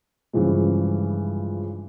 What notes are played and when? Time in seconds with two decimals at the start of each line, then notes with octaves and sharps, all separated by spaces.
0.33 G2 C#3 E3 F3 G#3